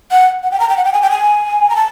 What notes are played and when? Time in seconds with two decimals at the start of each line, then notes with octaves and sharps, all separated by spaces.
0.11 F#5
0.43 F#5
0.52 G5
0.60 A#5
0.69 G5
0.77 F#5
0.85 G5
0.93 G#5
1.02 G5
1.11 G#5
1.70 A#5
1.76 A5